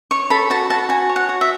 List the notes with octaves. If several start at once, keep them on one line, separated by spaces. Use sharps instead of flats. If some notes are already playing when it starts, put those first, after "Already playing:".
C#5 C#6
A4 B5
F#4 A5
F#4 A5
F#4 G#5
C#5
F#5
F#4
E5